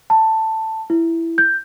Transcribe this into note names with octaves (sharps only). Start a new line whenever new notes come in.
A5
E4
G6